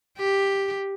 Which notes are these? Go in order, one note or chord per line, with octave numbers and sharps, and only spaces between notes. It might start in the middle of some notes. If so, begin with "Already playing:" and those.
G4